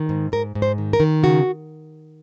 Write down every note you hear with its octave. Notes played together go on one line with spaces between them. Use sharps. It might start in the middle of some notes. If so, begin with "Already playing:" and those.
Already playing: D#3
G#2
G#2 A#4
G#2
C5
D#3
A#4
D#3
C#3 F#4